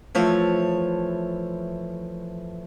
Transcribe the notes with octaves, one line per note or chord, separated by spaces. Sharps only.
E3 F3 A3 C#5